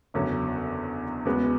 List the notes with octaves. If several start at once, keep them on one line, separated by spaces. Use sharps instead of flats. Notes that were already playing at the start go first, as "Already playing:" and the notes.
F#1 E2 D3 F#3 C#4
E2 C#3 G#3 B3 F#4